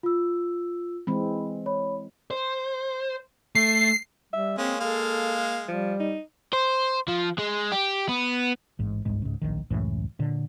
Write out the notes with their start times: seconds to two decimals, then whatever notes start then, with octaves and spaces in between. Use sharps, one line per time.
0.03 F4 E6
1.07 E3 G#3 C4 B5
1.66 C#5 B5
2.31 C5
3.55 A3 C7
4.33 G3 E5
4.58 G#3 A#3 C4 C#4
4.80 G#3 A4 F5
5.68 F3 G3
6.00 D#4
6.53 C5
7.08 F3
7.38 G#3
7.72 G4
8.09 B3
8.79 A1 G#2
9.05 G1 C#2 G#2 G#3
9.22 C#2 G#2
9.42 D1 A#1 D#3
9.70 C#2 F#2 A2 E3
10.19 A#2 D3